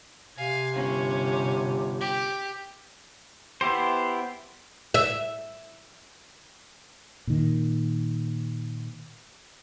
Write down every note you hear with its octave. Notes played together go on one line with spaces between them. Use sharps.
C3 F5 G#5
G1 C#4
G4
B3 E4 G4 C5
E5
A#2 D#3